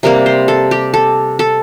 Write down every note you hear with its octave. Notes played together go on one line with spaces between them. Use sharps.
C3 G3 A#3 A#4
C5
A4
G4
A4
A4